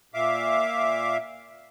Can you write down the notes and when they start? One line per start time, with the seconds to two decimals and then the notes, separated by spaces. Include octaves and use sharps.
0.14 A#2 E5 F5 D6